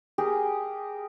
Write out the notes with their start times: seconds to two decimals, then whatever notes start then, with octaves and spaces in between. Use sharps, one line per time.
0.18 G4 G#4 A#4